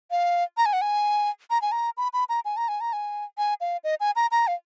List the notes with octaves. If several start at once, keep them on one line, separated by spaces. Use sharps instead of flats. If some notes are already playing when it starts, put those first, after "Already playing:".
F5
A#5
G#5
F#5
G#5
A#5
G#5
A#5
B5
B5
A#5
G#5
A#5
G#5
A#5
G#5
G#5
F5
D#5
G#5
A#5
A#5
F5